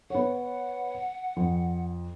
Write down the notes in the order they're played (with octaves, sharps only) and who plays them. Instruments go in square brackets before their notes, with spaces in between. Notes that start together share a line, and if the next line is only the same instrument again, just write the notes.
[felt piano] B3 C#5 [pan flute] F#5
[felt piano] F2